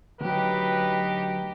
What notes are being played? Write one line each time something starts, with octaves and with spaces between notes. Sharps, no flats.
D2 F#3 D#4 G4 B4